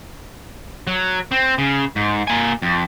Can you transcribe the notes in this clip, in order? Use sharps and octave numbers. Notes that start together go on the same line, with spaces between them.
F#3
C4
C#3
G#2
A#3 G#5
F2